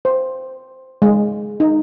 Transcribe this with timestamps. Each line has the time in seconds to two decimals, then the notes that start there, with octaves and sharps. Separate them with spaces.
0.05 C5
1.02 G#3
1.60 D#4